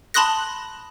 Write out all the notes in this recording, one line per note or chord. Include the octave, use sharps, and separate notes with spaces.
A5 B5 C6 D#6 F#6 A#6